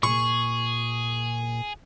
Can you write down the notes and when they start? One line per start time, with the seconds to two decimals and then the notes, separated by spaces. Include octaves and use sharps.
0.03 A#2 G#4 C#6